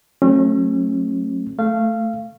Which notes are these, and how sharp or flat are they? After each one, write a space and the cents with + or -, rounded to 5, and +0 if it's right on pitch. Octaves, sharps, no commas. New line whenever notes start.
F#3 -15 A3 +0 C#4 -35
A3 +0 F5 -20